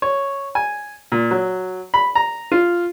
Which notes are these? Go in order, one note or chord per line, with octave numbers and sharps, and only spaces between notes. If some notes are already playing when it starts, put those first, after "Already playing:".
C#5
G#5
A#2
F#3
B5
A#5
F4